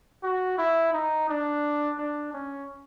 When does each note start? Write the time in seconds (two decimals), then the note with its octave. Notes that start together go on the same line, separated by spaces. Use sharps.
0.23 F#4
0.58 E4
0.93 D#4
1.29 D4
1.98 D4
2.33 C#4